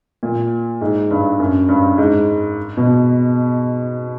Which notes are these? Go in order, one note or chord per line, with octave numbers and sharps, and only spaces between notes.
A#2
G#2
G2
F#2
G2
G#2
B2